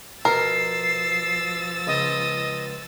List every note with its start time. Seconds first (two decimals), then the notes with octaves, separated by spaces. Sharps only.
0.25 B2 F3 A#4 E6 A6 C7
1.87 C#2 D#5